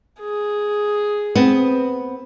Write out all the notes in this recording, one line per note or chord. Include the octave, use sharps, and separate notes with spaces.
G#4
B3 C4